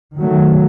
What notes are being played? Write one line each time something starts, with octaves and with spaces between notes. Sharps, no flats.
D#3 F#3 A3